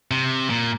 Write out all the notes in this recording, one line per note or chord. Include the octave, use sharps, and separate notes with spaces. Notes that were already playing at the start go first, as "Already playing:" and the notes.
C3
A#2